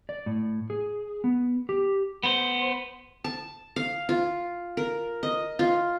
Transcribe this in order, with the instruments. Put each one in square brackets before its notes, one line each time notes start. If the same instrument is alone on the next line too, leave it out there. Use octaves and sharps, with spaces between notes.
[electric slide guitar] D5
A2
G#4
B3
G4
[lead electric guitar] B3 C5
[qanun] A5
F5
F4
A#4
D#5
F4